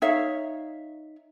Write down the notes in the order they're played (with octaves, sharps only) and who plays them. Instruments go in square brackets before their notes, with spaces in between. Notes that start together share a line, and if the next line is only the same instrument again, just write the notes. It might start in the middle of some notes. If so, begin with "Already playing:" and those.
[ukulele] D#4 C#5 E5 F5